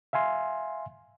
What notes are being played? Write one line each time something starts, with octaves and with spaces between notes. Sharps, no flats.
E5 F5 G#5 C6